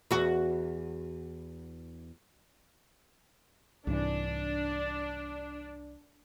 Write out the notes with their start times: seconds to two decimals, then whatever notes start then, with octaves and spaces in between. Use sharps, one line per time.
0.11 E2 F#4
3.87 C2 G#2 E3 D4